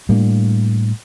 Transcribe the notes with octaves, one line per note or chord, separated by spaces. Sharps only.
A2 G3 A#3 D4